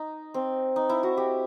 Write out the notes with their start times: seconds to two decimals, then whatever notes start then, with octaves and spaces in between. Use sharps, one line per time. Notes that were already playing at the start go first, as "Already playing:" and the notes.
Already playing: D#4
0.34 C4
0.76 D#4
0.89 E4
1.03 F#4
1.17 G4